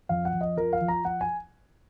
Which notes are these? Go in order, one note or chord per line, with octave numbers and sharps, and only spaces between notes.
F2 F5
F#5
F2
D#5
F3 A#4
F5
F3
A#5
F3 F#5
G#5